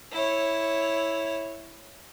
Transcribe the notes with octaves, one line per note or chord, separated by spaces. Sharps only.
E4 C#5